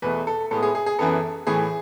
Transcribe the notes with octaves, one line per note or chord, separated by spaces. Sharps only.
E2 B2 A3 B4
A4
A2 G#3 B3 A4
G#4
G#4
G#4
F#2 E3 B3 A4
A2 E3 A3 G#4